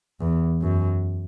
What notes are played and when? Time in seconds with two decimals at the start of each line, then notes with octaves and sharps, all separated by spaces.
0.20 E2
0.61 F#2